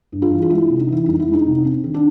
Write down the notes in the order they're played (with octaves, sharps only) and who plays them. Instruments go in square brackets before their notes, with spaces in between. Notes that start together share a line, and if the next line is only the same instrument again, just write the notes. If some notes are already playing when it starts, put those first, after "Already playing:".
[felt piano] G2
F4
E3
F4
G#3 E4
C3
D#4
E3 E4
F2 D#4
E4
G#3
D#4
C3
C4
D#3
D4